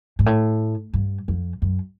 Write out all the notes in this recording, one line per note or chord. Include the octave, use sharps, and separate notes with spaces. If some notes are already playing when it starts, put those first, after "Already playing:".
G#2
A2
G2
F2
F#2